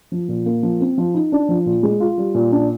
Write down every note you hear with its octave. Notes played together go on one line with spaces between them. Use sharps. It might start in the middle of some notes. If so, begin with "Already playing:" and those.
F3
A#2
A#3
F3
C4
F3
D#4
D4
F3
A#2
G#3
F4
G3
A#2
D4